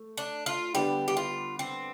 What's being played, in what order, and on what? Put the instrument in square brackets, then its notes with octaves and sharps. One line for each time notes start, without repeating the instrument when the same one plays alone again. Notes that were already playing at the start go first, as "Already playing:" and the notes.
Already playing: [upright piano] A3
[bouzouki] D4
F4
[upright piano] D3 G3 B3 D4 [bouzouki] G4
[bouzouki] G4
F4
C4